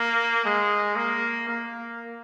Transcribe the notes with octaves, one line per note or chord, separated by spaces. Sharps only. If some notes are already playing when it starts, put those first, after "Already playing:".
Already playing: A#3
G#3
A#3
A#3